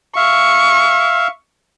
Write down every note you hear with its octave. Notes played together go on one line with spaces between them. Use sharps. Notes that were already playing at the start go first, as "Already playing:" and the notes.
E5 F5 C#6